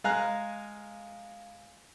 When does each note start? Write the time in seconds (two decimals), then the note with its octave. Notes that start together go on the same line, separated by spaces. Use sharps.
0.04 G#3 F5 G#5 A#5 F#6